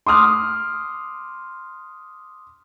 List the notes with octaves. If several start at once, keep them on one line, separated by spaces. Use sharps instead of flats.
C6 D6 D#6 F6